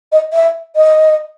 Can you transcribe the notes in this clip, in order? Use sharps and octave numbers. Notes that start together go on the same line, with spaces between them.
D#5
E5
D#5